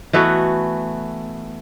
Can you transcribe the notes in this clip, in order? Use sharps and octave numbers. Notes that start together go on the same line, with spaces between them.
E3 A3 B3 F#4